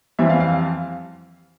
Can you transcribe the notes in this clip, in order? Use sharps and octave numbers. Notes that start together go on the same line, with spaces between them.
F2 E3 G3 C4 E5
F5
F5
F5